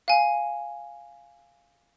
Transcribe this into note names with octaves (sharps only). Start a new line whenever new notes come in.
F5 G#5